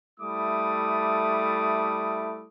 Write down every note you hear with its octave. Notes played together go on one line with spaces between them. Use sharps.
G3 A3 E4 A4 D6 D#6